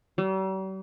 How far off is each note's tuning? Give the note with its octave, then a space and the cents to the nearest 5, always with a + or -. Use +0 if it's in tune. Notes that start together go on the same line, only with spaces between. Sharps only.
G3 -45